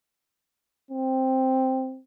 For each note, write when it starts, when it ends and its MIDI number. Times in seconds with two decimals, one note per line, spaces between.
0.91 1.99 60